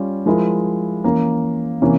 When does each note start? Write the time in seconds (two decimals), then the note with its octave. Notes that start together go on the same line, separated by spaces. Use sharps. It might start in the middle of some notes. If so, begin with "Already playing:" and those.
Already playing: G3 C#4 F4
0.26 F3 G#3 E4 A#4
1.04 E3 A#3 C#4
1.81 C3 E3 A#3 C#4